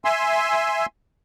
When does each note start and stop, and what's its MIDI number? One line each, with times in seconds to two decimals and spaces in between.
0.05 0.86 76
0.05 0.86 80
0.05 0.86 84
0.05 0.86 88